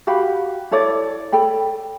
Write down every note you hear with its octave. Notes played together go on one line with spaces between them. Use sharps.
F#4 G4 F5 B5
E4 A4 C#5 D5
A4 G5 B5